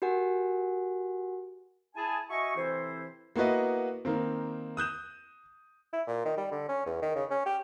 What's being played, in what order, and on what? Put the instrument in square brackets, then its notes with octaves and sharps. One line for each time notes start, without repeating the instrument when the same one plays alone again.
[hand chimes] F#4 G4 A#4 F#5 G#5
[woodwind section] E4 G#4 G#5 A5
F#4 D#5 E5 G#5 C#6
C3 E3 C4 E4 A4 C5
[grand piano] A#3 B3 E4 F#4 B4 D#5
D#3 A#3 C4
D#6 F#6 G6 E7
[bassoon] E4
A#2
D#3
G3
D3
C#4
E2
D#3
C#3
C#4
G4